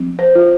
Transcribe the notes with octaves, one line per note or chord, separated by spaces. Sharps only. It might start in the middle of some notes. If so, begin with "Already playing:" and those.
Already playing: F3 C4
C5
F4